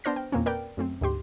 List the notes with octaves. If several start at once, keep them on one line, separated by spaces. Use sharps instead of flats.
B3 D4 C5 F6 A#6
G5
E2 A#2 A#3 C4 C#4
A#4 B4 D5 G5
F#2 A3 C4
D2 G#2 G4 C6